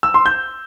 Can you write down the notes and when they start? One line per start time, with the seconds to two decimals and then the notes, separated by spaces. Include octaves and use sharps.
0.03 E6
0.14 C6
0.26 G6